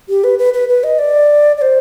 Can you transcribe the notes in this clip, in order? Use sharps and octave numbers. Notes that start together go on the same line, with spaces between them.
G4
B4
B4
B4
B4
D#5
D5
D5
C5